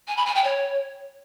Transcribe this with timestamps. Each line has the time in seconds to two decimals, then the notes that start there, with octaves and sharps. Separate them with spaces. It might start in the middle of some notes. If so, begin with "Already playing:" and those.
0.08 G#5
0.17 B5
0.26 G#5
0.35 G5
0.44 C#5